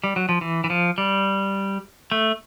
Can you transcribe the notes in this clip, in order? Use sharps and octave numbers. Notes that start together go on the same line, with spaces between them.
G3
F#3
F3
E3
E3
F3
G3
A3